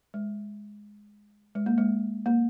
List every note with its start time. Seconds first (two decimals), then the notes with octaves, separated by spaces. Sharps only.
0.14 G#3
1.55 G#3
1.66 A#3
1.78 G#3
2.26 A#3